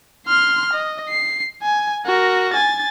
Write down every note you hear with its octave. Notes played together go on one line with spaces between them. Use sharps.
C6 F6
D#5
C7
G#5
F#4 A#4
G#5 A6